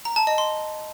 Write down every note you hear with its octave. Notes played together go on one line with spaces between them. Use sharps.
A#5
A5
D#5
C6